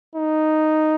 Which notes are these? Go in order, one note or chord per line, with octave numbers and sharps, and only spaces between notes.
D#4